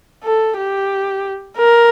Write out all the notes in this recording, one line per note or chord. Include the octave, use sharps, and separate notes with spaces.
A4
G4
A#4